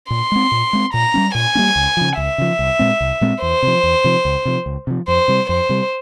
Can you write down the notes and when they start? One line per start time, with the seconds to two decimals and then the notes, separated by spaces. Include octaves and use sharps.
0.11 A#2 C6
0.32 G#3 C4
0.52 A#2
0.73 G#3 C4
0.93 A#2 A#5
1.14 G3 A#3 C#4
1.34 A#2 G#5
1.55 G3 A#3 C#4
1.76 C#2
1.97 C#3 F3
2.17 C#2 E5
2.38 C#3 F3
2.59 C2
2.79 A#2 G#3 C4
3.01 C2
3.21 A#2 G#3 C4
3.42 E2 C5
3.63 C3 F3
3.83 E2
4.04 C3 F3
4.25 C#2
4.45 C3 F3
4.66 C#2
4.87 C3 F3
5.08 F2 C5
5.28 C3 G3
5.49 F2 C5
5.69 C3 G3